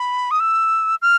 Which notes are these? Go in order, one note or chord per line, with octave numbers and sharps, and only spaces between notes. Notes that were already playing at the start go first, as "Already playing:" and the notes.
Already playing: B5
D#6
E6
F6